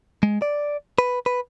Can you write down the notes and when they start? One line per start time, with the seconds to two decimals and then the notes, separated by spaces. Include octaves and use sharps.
0.23 G#3
0.42 D5
0.98 B4
1.26 B4